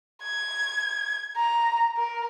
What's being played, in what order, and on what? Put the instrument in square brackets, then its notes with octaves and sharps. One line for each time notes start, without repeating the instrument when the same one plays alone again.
[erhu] G#6
A#5
A#4